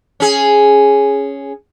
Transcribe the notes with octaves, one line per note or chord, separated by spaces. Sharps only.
C#4 G#4